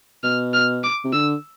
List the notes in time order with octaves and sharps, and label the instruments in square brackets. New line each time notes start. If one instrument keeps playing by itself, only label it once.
[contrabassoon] B2 [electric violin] F6
[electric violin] F6
D6
[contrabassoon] C3
[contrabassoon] D3 [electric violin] E6